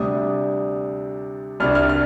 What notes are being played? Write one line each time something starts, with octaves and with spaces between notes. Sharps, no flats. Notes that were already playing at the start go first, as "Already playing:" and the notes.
Already playing: D2 C3 G3 D4 D#6
C2 C3 G3 D4 F6
F6
F6